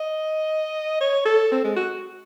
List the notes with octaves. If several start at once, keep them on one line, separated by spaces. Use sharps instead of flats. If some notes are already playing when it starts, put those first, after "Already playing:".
Already playing: D#5
C#5
A4
C4
G#3
F#4